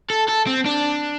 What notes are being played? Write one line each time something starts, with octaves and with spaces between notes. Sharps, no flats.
A4
A4
C4
D4